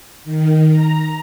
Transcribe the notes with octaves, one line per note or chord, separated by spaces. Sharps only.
D#3
A#5